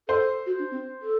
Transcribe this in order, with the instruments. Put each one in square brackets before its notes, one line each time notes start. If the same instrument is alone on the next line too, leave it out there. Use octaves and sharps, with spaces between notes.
[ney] A4 [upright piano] C5
[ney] F#4
D4
C4
A4